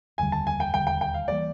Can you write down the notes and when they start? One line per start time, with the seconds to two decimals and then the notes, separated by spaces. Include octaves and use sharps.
0.18 F1 D#2 D3 G3 G#5
0.32 A5
0.47 G#5
0.60 G5
0.74 E1 D#2 D3 G3 G5
0.87 G5
1.01 G5
1.14 F5
1.28 E3 G3 A#3 D5